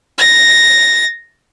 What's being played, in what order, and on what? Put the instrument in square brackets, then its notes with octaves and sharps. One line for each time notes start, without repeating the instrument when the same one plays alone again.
[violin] A6 A#6